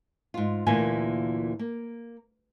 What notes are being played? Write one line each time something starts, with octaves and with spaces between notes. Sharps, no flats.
G#2 F4
D2 A#2 E3 A#3 G#5
A#3